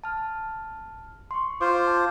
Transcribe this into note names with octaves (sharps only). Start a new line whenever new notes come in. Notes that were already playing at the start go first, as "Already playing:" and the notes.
A5 F6
C6 C#6
F4 C5 D6
A5